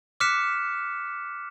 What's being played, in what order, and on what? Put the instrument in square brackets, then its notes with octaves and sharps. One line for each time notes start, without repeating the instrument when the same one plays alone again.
[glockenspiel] D6 F6 F#6 B6 C#7 E7